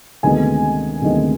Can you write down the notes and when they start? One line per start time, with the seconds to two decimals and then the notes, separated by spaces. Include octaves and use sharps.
0.23 D2 C3 D#3 G#3 B3 G#5
1.02 D2 C3 D#3 G#3 B3